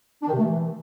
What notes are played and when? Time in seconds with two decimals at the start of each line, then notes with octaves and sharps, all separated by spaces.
0.23 D4
0.28 D#3
0.33 C3
0.39 A3
0.44 E3